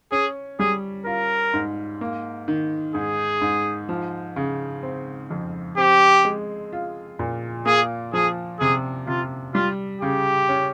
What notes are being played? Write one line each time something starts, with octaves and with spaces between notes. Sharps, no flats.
C#4 G#4
G3 G#4
F4 A#4
G#2
A#3
D#3
G#2 G#4
G#2
F3
C#3
C4
F2
C4 G4
G#3
F4
A#2
A#3 G#4
F3 G#4
C3 G#4
C3 F4
G3 F4
C#3 G4
C#4